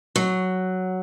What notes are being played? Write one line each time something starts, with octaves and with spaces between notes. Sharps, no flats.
F#3